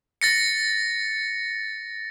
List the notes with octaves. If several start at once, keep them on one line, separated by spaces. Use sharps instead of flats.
A6 A#6 C#7